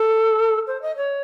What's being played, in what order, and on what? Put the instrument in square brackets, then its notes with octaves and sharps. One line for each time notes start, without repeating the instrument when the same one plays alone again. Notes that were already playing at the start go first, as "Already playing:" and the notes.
Already playing: [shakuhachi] A4
C5
D#5
C#5